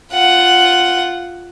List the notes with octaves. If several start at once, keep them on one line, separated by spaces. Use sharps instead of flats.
F4 F#5